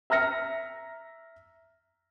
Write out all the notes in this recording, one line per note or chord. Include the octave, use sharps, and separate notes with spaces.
E5 A#5 F6 A#6 C#7